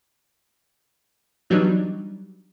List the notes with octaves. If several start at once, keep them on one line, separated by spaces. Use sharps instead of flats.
E3 F#3 G3 B3 D4 D#4